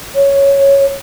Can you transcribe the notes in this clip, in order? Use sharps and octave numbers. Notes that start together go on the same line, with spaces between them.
C#5